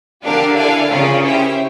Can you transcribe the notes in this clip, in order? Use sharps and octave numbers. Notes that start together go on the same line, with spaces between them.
D3 D4 G4 A#4 D5 F5 A5
E4 A4 D5 F5 G#5
C#3 C#4 F4 A#4 D5 G5
E4 G4 C5 E5 G5